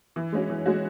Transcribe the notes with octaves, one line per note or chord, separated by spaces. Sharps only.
E3
G#3 C#4 F#4
E3
G#3 C#4 F#4